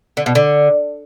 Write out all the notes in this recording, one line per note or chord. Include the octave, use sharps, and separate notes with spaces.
D3
B2
D3